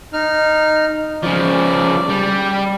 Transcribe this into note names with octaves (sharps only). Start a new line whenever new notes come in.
D#4 F6
C#3 F3 D5
G3